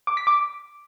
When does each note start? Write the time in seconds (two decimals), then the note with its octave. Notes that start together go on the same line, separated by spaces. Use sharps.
0.07 D6
0.17 B6
0.27 D6